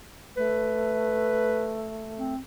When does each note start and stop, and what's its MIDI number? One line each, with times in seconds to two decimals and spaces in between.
0.37 2.34 57
0.37 1.86 71
2.18 2.39 60